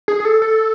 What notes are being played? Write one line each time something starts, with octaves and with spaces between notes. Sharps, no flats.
G#4
G#4
A4
A4